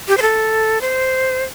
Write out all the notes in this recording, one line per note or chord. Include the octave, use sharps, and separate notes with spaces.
G4
C5
A4
C5